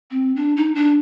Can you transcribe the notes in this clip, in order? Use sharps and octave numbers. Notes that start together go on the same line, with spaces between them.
C4
D4
D#4
D4